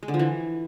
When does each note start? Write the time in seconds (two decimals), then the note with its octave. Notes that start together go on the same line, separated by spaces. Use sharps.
0.03 G#3
0.08 D3
0.14 F3
0.19 E3